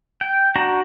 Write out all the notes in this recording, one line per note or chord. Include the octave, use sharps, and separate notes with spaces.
G5
D4 F#4 A#5